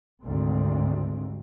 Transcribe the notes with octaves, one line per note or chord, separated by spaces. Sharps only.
G#1 D2 G#2 C3 C4